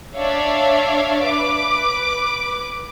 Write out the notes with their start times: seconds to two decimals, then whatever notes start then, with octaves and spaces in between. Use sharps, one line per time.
0.16 D4 C#5 D5 E5 F5
1.23 B4 D6